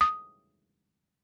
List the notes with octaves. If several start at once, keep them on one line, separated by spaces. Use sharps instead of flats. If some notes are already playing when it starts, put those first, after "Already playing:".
D#6